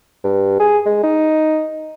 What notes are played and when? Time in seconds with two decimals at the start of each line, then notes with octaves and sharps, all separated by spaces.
0.24 G2
0.59 G#4
0.86 G#3
1.03 D#4